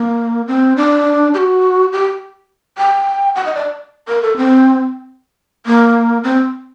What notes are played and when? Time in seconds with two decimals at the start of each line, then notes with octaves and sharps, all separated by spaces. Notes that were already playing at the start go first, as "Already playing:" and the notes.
Already playing: A#3
0.47 C4
0.77 D4
1.34 G4
1.38 F#4
1.92 G4
2.78 G5
3.35 F#5
3.46 D#5
3.55 D5
4.08 A#4
4.23 A4
4.37 C4
5.66 A#3
6.24 C4